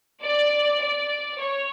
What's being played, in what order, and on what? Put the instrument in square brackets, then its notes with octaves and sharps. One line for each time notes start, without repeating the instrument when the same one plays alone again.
[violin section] D5
D5
C#5